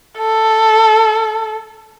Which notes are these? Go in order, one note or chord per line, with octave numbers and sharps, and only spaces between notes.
A4